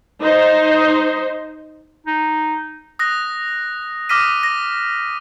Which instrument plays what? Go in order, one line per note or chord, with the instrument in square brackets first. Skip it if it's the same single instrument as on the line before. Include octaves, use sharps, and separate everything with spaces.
[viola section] D#4 C5
[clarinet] D#4
[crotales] D#6 F#6 A#6
D6 D#6 F6 A#6 B6 D#7
A#6